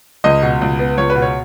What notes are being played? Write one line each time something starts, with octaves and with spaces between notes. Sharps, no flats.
C#2 D#5
B2
C#2
B3
C#2 C#5
B4
B2
C#5